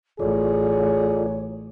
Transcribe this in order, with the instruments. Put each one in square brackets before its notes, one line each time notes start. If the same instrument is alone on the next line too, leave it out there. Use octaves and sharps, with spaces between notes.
[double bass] A1 [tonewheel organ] F4 A4 D5 [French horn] G#4 [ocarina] C#5